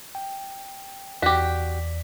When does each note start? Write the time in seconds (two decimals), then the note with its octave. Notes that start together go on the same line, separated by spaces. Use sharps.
0.15 G5
1.22 E2 F#4 G4 D5 B6